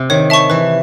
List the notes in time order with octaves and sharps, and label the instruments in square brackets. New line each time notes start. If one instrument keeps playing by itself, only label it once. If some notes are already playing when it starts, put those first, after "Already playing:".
Already playing: [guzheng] C3
[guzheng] D#3 [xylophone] C#5
[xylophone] E5 A5 C#6
[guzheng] E3 [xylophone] B4